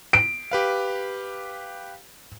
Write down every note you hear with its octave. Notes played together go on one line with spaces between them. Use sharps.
D7
G4 B4 F5